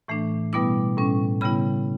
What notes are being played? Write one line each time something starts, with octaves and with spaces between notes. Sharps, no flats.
A2 E3 A3 D4
B2 G3 B3 E4 D6
A2 G3 C#4
C#3 G3 B3 E4 B5